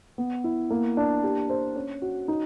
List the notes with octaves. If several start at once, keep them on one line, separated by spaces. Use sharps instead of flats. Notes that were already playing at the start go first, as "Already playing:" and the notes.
B3
E4
A#3
D4
G4
C5
C#4
F#4
D#4